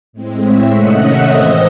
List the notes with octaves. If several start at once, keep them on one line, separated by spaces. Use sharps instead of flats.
A2 G#3 C4
C#5 E5
C3 D#3 A3 C#4 D#5 F#5
C#5 E5
A2 E3 G#3 C4 C5 D#5